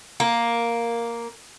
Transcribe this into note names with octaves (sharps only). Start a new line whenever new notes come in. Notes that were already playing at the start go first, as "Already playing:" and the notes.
A#3